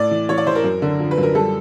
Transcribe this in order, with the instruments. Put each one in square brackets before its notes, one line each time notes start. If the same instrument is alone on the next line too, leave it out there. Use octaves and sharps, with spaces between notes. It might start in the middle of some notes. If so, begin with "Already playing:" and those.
Already playing: [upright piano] A2 D5
E3
E3 C#5
D5
E3 C5
A#4
F#2
D3
F3
B4
F#2
A#4
G3 A4